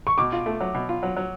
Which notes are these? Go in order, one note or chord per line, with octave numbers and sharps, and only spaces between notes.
C#6
B2 D6
F4
A3
F#3
B2
F4
F#3
F#3